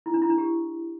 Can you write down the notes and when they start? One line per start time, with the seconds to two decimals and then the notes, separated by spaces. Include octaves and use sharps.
0.06 E4
0.14 D4
0.22 E4
0.30 D4
0.38 G4